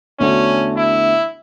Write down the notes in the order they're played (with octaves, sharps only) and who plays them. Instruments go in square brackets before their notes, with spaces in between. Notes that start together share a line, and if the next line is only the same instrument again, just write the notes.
[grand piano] E2 D3 A3 D4 F#4 [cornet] C#4
[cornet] E4